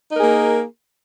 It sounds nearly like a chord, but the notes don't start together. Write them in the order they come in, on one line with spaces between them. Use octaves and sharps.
D#4 A#4 G#4 A#3